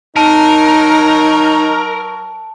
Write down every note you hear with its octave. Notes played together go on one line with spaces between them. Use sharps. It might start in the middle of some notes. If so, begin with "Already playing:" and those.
F#3 D#4 A#4 A5